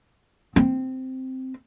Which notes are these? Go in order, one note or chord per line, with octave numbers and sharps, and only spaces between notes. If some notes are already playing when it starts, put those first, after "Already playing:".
C4